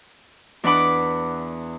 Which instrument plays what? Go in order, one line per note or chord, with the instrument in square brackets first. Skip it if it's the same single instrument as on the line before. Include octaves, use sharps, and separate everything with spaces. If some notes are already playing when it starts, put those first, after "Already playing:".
[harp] E2 D4 B4 F#5 B5 D6